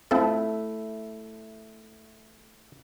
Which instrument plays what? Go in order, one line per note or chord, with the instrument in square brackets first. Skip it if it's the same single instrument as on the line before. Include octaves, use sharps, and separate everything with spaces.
[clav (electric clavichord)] A3 E4 [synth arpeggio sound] C4 F4 A4